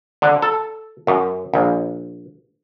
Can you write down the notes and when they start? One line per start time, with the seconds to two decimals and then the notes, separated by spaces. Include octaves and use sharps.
0.22 D3
0.42 A4
1.07 F#2
1.54 A#1